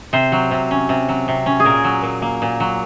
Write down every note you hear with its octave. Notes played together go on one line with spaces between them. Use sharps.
C3 C5
F#3
C3
C#4
C3
F#3
C3
C#4
G#4
A#2 A#4
F#3
A#2
A#3
A#2
F#3